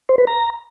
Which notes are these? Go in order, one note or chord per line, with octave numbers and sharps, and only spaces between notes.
C5
B4
A#5